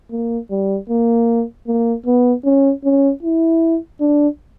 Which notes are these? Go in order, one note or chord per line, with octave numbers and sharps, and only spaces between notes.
A#3
G3
A#3
A#3
B3
C#4
C#4
E4
D4